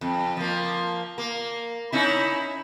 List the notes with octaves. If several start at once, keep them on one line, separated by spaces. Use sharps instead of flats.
F2
F3 A#3
A#3
C#4 D#4 E4